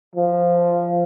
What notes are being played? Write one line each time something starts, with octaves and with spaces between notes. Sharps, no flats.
F3